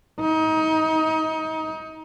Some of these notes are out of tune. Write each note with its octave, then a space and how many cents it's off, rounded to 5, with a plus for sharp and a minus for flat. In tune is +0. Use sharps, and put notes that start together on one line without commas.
D#4 +25